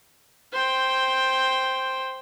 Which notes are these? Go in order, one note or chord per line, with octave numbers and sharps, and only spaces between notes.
C5 G5